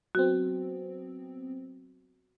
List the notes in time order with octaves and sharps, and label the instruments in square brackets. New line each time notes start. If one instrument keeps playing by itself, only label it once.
[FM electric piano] F#3 B3 C4 [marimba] F#4